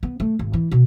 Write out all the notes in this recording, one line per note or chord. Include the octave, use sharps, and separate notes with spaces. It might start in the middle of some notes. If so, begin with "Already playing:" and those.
B3
A3
G#1
E3
B2